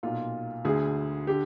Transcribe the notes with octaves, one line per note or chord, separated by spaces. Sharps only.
B1 A#2 F4
D2 D3 G#4
D3 G4